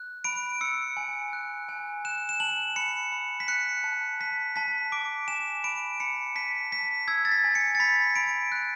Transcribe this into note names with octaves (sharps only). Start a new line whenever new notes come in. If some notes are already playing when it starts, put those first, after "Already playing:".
Already playing: F#6
B5 D7
E6 C#7
G#5
F#6
G#5
F#6 E7
E7
A5 F#7
B5 C#7
B5
B6
F#6 C#7
A5
A5 B6
A5 B6
D6 D7
G#5 E7
B5 D7
B5 C#7
A5 B6
A5 B6
E6 G#6
A6
B6
G#5
C#7
A6
B5 B6
B5 D7
F#6